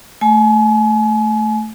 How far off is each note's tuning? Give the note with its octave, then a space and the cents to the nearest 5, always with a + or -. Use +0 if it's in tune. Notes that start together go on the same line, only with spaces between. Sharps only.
A3 +0 G#5 +35